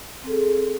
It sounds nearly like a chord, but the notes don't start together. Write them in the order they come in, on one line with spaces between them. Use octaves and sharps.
C4 A4 G#4